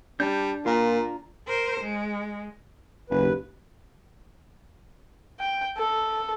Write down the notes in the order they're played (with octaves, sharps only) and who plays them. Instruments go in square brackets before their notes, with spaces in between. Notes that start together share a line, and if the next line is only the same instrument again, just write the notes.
[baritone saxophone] G3 [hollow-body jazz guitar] D4 [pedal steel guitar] A5 G6
[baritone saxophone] A#2 [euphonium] A#3 [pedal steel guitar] F4 A#5
[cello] A#4 C5
G#3
[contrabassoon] F#1 [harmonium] D#2 B4
[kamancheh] G5
A4